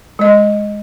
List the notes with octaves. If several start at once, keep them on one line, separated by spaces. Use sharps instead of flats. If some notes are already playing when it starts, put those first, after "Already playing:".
G#3 D#5